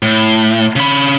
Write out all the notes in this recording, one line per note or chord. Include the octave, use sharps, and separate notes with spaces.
A2
C#3 B5